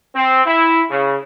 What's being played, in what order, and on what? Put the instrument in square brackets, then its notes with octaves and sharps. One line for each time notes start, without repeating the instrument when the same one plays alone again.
[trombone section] C4
E4
C#3